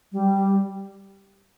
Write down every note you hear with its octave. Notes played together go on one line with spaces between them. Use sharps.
G3